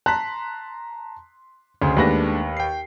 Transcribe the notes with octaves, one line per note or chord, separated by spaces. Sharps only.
A5 A#5 C6 F#6 B6
D2 C#3 C6
D#2 G#3 A3 D4 B4 A#6
G5 C7